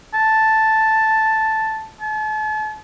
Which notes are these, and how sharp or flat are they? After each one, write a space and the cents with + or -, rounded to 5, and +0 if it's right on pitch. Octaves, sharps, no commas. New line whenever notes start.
A5 +0
A5 -40